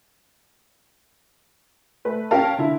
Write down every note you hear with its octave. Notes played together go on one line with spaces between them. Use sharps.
A3 B4
C#4 G4 A#4 F5 A5
D3 E4